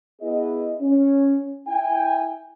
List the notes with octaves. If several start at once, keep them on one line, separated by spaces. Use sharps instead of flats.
B3 E4 G#4 D#5
C#4
E4 G5 G#5